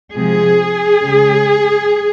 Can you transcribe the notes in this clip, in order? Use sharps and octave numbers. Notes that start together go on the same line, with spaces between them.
C3 F3 G#3 G#4
C#3 G#3